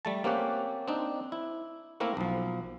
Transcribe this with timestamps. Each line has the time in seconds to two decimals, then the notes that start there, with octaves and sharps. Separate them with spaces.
0.05 G3 A3 A5
0.24 A#3 C4 C#4 G4 F#5
0.88 C4 D4 D#4
1.32 E4
2.00 A3 A#3 C4 E4 A#4
2.17 B1 F3